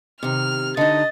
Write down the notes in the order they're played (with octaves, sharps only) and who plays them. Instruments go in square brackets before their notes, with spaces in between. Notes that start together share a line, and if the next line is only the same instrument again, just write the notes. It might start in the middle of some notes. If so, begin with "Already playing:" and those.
[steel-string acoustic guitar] C3 D#3 [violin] F6
[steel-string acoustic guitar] D3 D#4 [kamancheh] D#5 [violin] A6